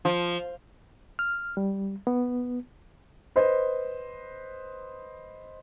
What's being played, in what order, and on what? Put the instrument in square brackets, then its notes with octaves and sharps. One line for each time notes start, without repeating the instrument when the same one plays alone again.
[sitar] F3
[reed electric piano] F6
G3
B3
[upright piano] B4 C5 D#5